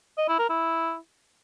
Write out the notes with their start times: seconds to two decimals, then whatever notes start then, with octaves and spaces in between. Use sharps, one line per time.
0.18 D#5
0.28 E4
0.39 A#4
0.49 E4